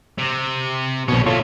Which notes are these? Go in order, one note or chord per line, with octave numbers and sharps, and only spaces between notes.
C3
A#1 B2 D#3 C#4
A#2 A3 F4 A4 C#5